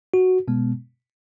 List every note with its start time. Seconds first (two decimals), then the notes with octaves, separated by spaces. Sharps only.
0.14 F#4
0.48 B2 G#3 B3